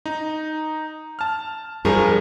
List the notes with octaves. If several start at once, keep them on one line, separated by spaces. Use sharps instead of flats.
D#4
A5 F6
G2 F3 G3 G#4 A#4